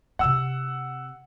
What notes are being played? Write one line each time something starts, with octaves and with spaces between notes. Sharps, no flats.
C3 C4 F#5 E6